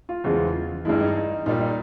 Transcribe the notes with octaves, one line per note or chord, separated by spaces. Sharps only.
F4
E2 C#3 F3 G#3
G2 E3 G#3 E4
D#4
A#2 G3 D#4
D#4